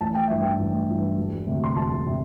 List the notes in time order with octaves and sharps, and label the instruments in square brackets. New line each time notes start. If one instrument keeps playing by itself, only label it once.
[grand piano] A1 A5
G5
G2 E3 E5
G5
A1
G2 E3
E1
D2 C3
C6
E1 A5
C3